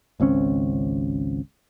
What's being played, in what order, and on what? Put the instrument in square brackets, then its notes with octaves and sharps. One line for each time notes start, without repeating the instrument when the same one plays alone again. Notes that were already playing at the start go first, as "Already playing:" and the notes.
[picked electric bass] G#1 C#2 C4 C#4